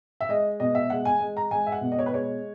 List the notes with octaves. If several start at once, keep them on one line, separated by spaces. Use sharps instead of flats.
E5
G#3 D#5
B2 D#5
E5
G#3 F#5
G#5
G#3
A#5
G#3 G#5
E5
F#5
B2
D#5
C#5
B4
G#3 C#5